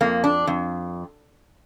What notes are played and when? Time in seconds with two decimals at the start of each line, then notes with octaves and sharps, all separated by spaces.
0.01 F2 A#3
0.24 D4
0.47 F2